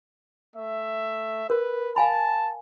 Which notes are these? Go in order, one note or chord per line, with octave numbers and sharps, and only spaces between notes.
A3 E5
A#4 B4
F5 G#5 A5 B5